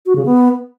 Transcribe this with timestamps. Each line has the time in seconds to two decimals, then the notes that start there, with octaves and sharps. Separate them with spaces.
0.06 F#4
0.16 C#3
0.25 B3